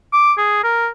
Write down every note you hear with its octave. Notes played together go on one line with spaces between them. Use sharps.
D6
G#4
A#4